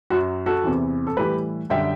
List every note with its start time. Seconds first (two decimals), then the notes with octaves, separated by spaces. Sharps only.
0.10 F#2 F#3 F#4
0.46 F#4 A4
0.64 E2 C3 E3
1.07 A4
1.17 A2 E3 G3 G4 B4
1.70 F#2 D3 G3 E5 G5